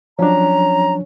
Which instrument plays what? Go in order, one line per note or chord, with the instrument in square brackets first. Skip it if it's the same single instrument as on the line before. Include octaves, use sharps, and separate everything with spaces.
[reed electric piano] F3 F#3 D4 [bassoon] C#4 [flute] A#5